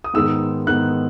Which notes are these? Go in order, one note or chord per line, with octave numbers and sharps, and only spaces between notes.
D#6
G#2 D#3 G#3 B3 E6
G#2 D#3 G#3 B3 F#6